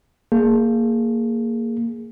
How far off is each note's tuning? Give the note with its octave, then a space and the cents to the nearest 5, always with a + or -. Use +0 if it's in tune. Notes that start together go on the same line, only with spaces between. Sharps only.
A#3 -15 G#4 +0